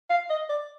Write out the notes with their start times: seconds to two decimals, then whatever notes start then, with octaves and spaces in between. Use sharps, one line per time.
0.10 F5
0.30 D#5
0.49 D5